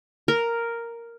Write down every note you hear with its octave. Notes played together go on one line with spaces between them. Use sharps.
A#4